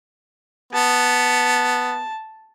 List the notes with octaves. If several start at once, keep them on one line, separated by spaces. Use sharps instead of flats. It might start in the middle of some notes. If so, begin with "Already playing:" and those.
B3 A5